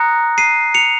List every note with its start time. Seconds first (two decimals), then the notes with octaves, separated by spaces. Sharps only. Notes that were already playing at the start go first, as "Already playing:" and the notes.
Already playing: A#5 D#6 F#6 A#6 C#7
0.38 C7 D#7
0.74 C#7 F7